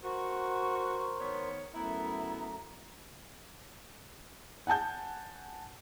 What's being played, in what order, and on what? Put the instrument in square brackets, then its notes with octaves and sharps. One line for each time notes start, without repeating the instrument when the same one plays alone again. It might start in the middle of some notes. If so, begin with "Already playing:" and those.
[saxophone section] F#4 [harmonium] A#4 C5 [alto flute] C#6
[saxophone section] D#3 B3 C#5
[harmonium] F#2 A3 [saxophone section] B3 E4 [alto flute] A#5
[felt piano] F#5 G#5 A5 G6